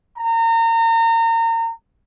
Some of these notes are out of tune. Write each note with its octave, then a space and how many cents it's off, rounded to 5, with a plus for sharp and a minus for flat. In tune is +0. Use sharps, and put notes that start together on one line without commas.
A#5 -35